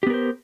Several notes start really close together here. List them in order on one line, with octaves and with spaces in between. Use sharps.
G4 B3 A#4 C5